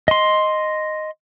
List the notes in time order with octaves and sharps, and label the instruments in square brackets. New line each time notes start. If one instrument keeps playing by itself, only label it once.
[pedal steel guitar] D#5 C6